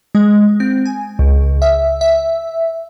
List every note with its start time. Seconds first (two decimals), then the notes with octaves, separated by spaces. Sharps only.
0.15 G#3
0.60 C4
0.85 G#5
1.19 C#2
1.62 E5
2.01 E5